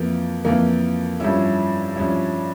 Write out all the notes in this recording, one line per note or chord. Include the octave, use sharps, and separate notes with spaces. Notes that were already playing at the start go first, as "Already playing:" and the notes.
Already playing: F2 E3 A#3
F2 E3 A#3
G2 F3 C#4 E4
G2 F3 C#4 E4